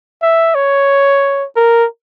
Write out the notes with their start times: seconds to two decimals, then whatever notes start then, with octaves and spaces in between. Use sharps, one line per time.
0.22 E5
0.55 C#5
1.56 A#4